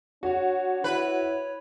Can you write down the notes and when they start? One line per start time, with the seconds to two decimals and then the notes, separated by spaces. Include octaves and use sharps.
0.23 D4 F#4 C#5
0.84 E4 B4